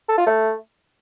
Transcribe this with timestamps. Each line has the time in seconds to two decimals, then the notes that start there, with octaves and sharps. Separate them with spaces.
0.09 A4
0.18 F4
0.27 A3